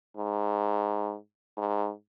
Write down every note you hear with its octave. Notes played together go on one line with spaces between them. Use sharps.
G#2
G#2